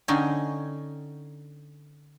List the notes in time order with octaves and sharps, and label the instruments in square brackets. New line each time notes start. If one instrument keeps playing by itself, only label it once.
[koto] D3 C#4 D#4 G5 G#5